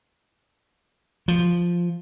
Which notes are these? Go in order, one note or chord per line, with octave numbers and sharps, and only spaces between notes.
F3